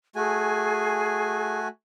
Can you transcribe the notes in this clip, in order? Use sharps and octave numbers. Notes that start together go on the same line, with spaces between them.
A3 F#4 G#4 G#5